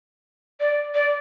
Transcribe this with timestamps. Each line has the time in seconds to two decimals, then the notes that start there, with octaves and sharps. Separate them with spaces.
0.60 D5
0.95 D5